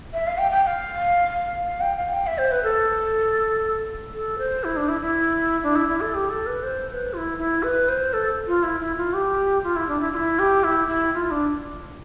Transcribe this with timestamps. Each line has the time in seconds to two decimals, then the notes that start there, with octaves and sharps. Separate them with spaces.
0.14 E5
0.27 F5
0.38 G5
0.51 G5
0.63 G5
0.67 F5
1.64 F5
1.81 G5
1.97 F5
2.13 G5
2.27 E5
2.38 C5
2.52 B4
2.64 A4
4.14 A4
4.38 C5
4.64 E4
4.76 D4
4.89 E4
5.01 E4
5.63 D4
5.76 E4
5.88 E4
6.01 A4
6.14 G4
6.30 A4
6.47 B4
6.63 C5
6.89 C5
6.93 B4
7.13 F4
7.18 E4
7.38 E4
7.63 B4
7.89 C5
8.13 A4
8.47 F4
8.63 E4
8.81 E4
8.97 F4
9.14 G4
9.64 F4
9.76 E4
9.88 D4
10.01 E4
10.13 F4
10.16 E4
10.39 G4
10.64 E4
10.88 E4
11.14 F4
11.31 D4